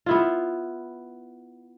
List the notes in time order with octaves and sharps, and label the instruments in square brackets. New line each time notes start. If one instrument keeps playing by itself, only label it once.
[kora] B3 E4 F4